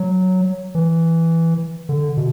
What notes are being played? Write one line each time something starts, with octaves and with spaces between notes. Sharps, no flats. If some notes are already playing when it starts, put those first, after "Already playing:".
Already playing: F#3
E3
D3
B2